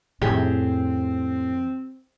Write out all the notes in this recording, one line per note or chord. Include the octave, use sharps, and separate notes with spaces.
F2 A2 D#3 C4 G4 G#4